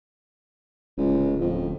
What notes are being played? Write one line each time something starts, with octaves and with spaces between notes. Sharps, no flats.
D1 C#2
F2